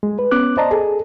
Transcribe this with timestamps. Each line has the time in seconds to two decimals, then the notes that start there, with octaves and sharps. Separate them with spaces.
0.03 G#3
0.19 B4
0.31 B3 C#4 D6 F#6
0.57 C5 D5 D#5 A5 A#5
0.71 G#4 A4